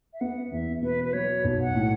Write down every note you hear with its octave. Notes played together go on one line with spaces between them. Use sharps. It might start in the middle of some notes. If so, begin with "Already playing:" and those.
E5
B3 F#5
E2 E5
B2 B4
B4
F#3 C#5
B1
F#5
A2